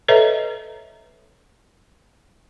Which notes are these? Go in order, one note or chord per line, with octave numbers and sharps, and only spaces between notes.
A4 B4 C#5 D#5 E5 A#5